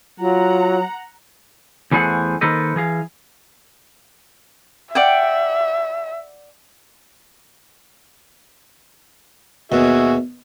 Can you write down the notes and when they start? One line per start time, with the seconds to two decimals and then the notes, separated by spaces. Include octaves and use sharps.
0.20 F#3 F4 F#5 A#5
1.92 E2 E3 A3 G#4 C5 F#5
2.41 D#3 A#3 A4 B4 C5 D#5
2.76 E3 G#4 F5
4.95 D5 E5 F#5 G5
9.72 D#2 B2 F#4 G#4 E5